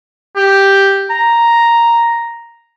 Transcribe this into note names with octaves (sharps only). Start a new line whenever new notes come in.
G4
A#5